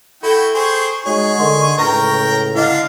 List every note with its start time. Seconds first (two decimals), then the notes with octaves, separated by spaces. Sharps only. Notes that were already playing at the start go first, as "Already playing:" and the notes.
0.23 E4 F#4 A4 G5 B5
0.54 G#4 C5 G5 C#6
1.06 G#3 D#4 F#4 G#4 C#5
1.39 D3 A#4 D#5 C6
1.78 C#2 A2 A#4 B4 G5 A#5 A#6
2.56 D3 D4 E4 D#5 F5 F#5